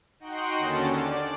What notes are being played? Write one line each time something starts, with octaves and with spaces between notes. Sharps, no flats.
D#4 F#4 F#5 G5 C6
D#2 D3 C#4 A5
D5